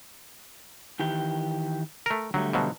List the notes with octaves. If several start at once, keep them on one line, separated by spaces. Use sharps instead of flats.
D#3 E3 G4
A3 A#4
D3 F#3 G3 A3
B2 F3 F#3